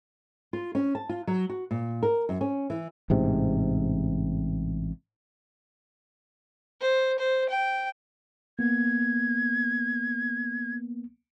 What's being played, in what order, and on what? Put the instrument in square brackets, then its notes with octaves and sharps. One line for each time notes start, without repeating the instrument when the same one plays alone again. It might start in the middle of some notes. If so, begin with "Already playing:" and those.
[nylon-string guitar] F4
C#4
A5
F4
F#3
F#4
A#2
A#4
F#2
C#4
E3
[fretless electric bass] A1 G#2 C3
[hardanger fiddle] C5
C5
G5
[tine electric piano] A#3 B3 [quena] G#6